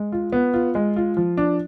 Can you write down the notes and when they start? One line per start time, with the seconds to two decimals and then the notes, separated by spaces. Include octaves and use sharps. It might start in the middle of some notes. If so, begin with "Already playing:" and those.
Already playing: G#3
0.12 F4
0.33 B3
0.54 F4
0.75 G#3
0.96 F4
1.17 F3
1.37 D4